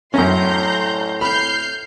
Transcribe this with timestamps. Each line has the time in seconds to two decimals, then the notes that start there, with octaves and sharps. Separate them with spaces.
0.14 F#2 A2 C#4 A#5 C6 G6
1.21 B5 F6 G6 C7